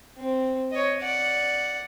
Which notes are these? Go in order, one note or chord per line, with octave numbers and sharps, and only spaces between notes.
C4
C#5 D#5
D5 F#5